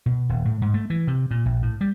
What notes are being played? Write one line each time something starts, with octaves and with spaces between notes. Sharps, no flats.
B2
D#1
A2
G#2
A3
E3
C3
A#2
A#1
A2
G3